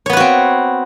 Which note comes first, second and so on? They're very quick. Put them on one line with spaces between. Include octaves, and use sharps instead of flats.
C#5 B3 B4 F#4 C4